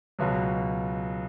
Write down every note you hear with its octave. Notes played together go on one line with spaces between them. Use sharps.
C#2 B2 F#3